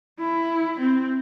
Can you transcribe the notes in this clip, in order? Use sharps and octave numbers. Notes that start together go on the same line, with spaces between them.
E4
C4